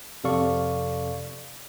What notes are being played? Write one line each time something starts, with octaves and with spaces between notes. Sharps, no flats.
F2 C3 A4 D5 F5 C#6